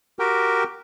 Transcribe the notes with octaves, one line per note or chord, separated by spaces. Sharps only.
F#4 G4 A#4 G5